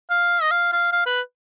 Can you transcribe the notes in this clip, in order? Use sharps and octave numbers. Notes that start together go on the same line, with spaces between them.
F5
D#5
F5
F5
F5
B4